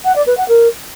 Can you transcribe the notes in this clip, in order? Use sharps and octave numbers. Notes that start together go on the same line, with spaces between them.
F#5
D5
B4
F#5
A#4